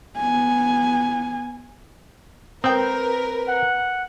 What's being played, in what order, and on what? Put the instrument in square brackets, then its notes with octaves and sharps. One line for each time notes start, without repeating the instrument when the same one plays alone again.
[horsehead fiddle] B3 G#5
[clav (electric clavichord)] C4 [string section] A#4 B4 [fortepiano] G5 D#6
[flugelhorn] F#5